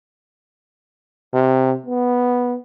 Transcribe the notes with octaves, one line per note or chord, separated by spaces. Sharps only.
C3
B3